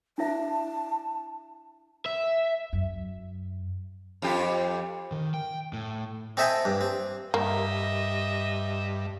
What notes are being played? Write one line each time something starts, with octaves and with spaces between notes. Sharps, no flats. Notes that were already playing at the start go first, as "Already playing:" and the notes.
D4 E4 E5 A5
E5
F#2
F2 F4 G4
D#3
G5
A2
C4 A4 D#5 E5 G5 G#5
G2
C4
G2 A#3 D#5 E5